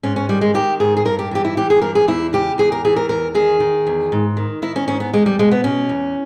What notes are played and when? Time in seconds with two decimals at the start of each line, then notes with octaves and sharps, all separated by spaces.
0.03 G#2 C#4
0.16 C#4
0.29 D#3 G3
0.41 G#3
0.54 D#3 G4
0.80 G#2 G#4
0.97 G#4
1.05 G2 A#4
1.19 G4
1.31 E3 G4
1.45 E4
1.57 E3 G4
1.70 G#4
1.82 G2 A#4
1.95 G#4
2.08 E2 E4
2.33 C#3 G4
2.58 E2 G#4
2.72 A#4
2.85 E3 G#4
2.96 A#4
3.09 E2 A#4
3.35 D#3 G#4
3.60 D#3
3.87 E2
4.12 G#2
4.37 D#3
4.62 D#3 E4
4.76 C#4
4.88 G#2 C#4
5.00 B3
5.14 E2 G#3
5.26 G3
5.39 B2 G#3
5.51 B3
5.64 B2 C#4
5.89 E2